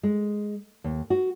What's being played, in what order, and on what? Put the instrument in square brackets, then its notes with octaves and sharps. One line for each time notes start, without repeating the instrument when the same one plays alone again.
[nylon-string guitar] G#3
D#2
F#4